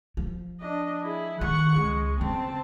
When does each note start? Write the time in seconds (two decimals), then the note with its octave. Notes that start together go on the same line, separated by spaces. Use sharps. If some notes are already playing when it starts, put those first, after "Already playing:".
0.17 F3
0.60 D4 D#5
1.03 E4 G#4
1.41 D#3 F#5 C#6
1.76 C#2 G#3
2.21 C#3 C4 A5